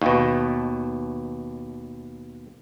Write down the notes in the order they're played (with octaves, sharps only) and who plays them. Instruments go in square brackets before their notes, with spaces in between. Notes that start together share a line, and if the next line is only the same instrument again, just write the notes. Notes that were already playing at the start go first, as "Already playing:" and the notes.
[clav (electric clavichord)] D#2 B2